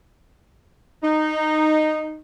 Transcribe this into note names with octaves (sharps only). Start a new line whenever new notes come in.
D#4